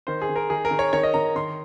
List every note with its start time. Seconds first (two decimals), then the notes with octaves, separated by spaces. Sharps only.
0.07 D#3 C5
0.22 G#4
0.29 D#3
0.36 A#4
0.50 D#3 G#4
0.65 A#4
0.71 D#3
0.79 C#5
0.93 D#3 C#5
1.03 D#5
1.14 D#3 A#5
1.36 D#3 C6